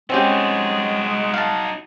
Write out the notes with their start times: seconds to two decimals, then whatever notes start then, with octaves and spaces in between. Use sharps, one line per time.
0.10 G#3 C4 C#4 D#4 F#4 G4
1.34 F5 A5